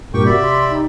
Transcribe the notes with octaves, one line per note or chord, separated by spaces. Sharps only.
G2 A#2 G4 A#4 G5 C#6
C3 F#4 D5 E5 B5
C6
D#4